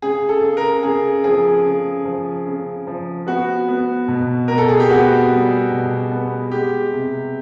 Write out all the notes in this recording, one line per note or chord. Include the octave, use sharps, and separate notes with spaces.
C#3 G#4
A4
C#3
A#4
C#3 G#4
F3 G#4
C#3
F3
C#3
F3
B3 F#4
B3
B2
B2 A#4
A4
G#4
G4
B3 F#4
G3
B2
B3
G#3 G4
C3